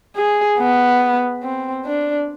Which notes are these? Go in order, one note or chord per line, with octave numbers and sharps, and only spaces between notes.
G#4
B3
C4
D4